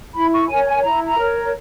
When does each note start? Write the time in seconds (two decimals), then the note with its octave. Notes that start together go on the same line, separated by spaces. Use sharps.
0.14 E4 B5
0.32 C#6
0.48 A#4 C#5 G#5
0.66 G#5
0.82 E4 A#5
1.05 A#5
1.17 A#4 C#5